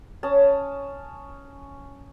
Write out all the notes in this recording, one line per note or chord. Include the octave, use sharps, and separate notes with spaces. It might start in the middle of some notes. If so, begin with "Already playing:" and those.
C#4 A5 D#6